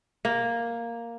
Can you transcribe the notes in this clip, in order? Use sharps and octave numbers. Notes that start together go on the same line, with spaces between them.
A#3